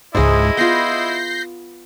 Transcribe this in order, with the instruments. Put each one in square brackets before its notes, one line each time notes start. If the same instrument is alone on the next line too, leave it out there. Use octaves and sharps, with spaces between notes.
[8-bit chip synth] C#2 G#2 [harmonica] E4 D#5 [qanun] G#4 C5
[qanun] B3 F4 [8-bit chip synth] G6 A#6 C7